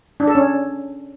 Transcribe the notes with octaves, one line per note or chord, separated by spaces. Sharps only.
D4
A4
C#4